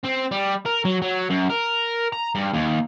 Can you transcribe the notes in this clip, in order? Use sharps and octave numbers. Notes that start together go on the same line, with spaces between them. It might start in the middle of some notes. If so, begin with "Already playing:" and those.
C4
G3
A#4
F#3
F#3
F#2
A#4
A#5
G2
D#2